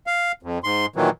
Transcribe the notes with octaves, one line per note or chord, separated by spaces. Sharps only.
F5
F2
G#2 C6
A#2 D#3 E3 F#3